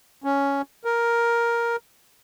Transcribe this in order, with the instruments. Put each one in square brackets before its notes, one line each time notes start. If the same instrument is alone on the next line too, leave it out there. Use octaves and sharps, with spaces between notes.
[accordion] C#4
A#4